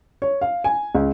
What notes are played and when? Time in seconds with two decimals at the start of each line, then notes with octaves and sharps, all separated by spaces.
0.22 C#5
0.41 F5
0.64 G#5
0.95 C#2